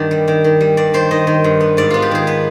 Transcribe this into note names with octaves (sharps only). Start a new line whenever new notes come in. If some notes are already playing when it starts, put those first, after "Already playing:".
Already playing: G2 D#3 B3 D5
G3
D#3
D#3
G3
G2 D5
D#3 C5
D#3 D#5
D#3
G2
B3
G#2 D5
B3 F4
G4
D#3 G#4
B3 B4